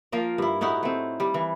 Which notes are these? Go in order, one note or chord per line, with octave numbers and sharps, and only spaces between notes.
F3 A#3 F4 A#4
G2 E4
A2 D#4 E4 F#4
A3 C4
G3
E3